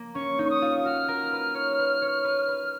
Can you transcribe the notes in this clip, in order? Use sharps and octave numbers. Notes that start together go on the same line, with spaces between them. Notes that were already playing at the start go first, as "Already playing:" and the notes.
Already playing: A#3
C#4 C#6
D#4
C#6
D#6
F4
F#4 F6
A#4
B4
C#5
B4
C#5
B4
B4